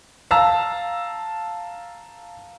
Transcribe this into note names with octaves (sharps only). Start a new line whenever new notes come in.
F5 A5 A#5 E6